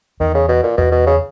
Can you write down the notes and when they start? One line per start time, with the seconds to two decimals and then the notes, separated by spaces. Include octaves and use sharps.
0.20 E2 D#3
0.35 C#3
0.49 B2
0.63 A#2
0.77 E2 B2
0.92 B2
1.06 C#3